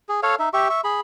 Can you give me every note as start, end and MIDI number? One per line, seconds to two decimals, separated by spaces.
0.09 0.20 68
0.23 0.35 69
0.23 0.35 73
0.23 0.35 77
0.39 0.49 63
0.39 0.49 76
0.53 0.68 67
0.53 0.68 76
0.53 0.68 85
0.70 0.81 76
0.70 0.81 85
0.84 1.01 68
0.84 1.01 83